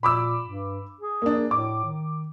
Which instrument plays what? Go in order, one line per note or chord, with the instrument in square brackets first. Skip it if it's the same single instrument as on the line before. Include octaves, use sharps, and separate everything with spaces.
[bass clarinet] A#2 [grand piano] B5 D6 E6
[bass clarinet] G2
G#4
[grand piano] A#3 D4
[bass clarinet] A2 [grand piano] D6
[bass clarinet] D#3